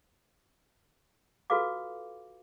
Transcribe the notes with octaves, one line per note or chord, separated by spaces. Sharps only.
F4 F#4 A4 B4 F5 D6